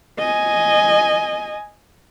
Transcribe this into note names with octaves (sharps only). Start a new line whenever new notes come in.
D#5 G#5